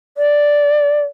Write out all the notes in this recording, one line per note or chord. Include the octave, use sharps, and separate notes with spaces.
D5